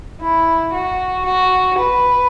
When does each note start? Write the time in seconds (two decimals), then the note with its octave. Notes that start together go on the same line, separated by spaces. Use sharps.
0.21 E4
0.73 F#4
1.25 F#4
1.78 B4